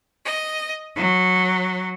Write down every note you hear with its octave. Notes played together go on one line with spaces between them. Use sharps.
D#5
F#3